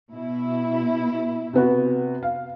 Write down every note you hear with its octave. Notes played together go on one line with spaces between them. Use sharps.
B2 E4
C3 B3 F#4
F5